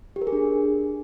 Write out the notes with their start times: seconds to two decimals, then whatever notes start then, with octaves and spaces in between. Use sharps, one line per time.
0.16 G4
0.22 A#4
0.27 G#4
0.32 D4